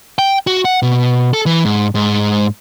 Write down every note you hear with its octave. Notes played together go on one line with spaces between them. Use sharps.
G5
F#4
F#5
B2
A4
E3
G#2
G#2